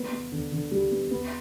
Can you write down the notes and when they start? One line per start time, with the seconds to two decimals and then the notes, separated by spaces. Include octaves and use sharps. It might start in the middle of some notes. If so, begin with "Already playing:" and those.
Already playing: B3
0.12 B3
0.32 D3
0.52 D3
0.71 G3
0.91 B3
1.11 B3